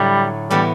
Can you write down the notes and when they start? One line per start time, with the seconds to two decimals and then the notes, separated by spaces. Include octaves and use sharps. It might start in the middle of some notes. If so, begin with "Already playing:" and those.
Already playing: A2 D3 F#3 G3 A3
0.50 A2 E3 G3 B3